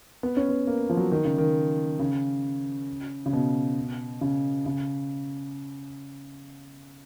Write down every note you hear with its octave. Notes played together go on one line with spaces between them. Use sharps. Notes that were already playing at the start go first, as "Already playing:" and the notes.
B3
C#4
B3
A#3
F3
F#3
D#3
C#3
D#3
C#3
C#3
B2
C#3
C#3